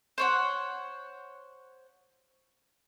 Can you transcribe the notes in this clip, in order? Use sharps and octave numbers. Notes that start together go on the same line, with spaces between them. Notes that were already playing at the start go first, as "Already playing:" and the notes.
C5 C#5 F#5